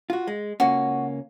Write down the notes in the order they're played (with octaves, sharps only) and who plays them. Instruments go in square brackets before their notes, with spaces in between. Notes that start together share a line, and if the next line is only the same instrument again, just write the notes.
[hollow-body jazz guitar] F4 F#4
G#3
[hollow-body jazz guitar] C#2 A#3 C#4 [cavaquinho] F#4